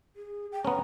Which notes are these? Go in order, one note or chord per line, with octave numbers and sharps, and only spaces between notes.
G#4
G5
B3 C#4 A#5